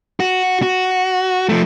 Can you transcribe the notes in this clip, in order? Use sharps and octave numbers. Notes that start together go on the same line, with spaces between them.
F#4
F#4
F3 A3